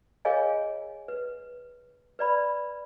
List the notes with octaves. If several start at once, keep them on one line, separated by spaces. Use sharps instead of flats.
G#4 A#4 C#5 D#5 F5 G#5
B4
B4 D5 B5